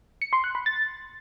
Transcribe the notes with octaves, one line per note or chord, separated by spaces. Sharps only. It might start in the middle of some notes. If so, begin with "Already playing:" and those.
C#7
C6
F#6
B5
A6